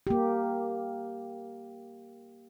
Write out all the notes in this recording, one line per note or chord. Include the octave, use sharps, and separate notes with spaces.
A#3 G4